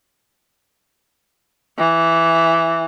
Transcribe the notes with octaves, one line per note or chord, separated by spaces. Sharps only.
E3